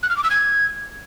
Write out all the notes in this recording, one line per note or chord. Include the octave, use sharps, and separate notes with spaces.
F#6
F6
D6
E6
G#6